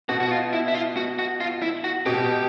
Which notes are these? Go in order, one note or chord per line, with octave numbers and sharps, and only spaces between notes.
B2 F#4
F#4
F4
E4
E4
F4
F#4
F#4
F4
E4
F#4
B2 G4